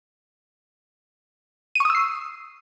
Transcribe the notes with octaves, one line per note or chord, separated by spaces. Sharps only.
C#6 D#6 E6 C7 D#7